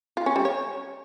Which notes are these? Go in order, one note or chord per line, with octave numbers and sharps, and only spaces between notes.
F4
C#4
G3
C#5